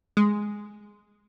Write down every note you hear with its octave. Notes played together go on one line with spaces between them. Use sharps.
G#3